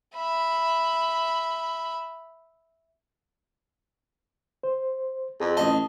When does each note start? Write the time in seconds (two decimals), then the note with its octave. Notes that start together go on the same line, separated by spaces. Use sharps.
0.16 E5 B5
4.63 C5
5.40 F2 G#4
5.57 A1 D#5 A5 D#6